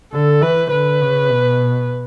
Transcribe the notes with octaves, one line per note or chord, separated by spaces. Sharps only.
D3 A4
E3 B4
D3 B4
C#3
B2